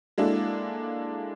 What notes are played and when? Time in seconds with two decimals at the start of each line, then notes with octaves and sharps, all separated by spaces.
0.18 G#3 A#3 D4 E4 F#4 A4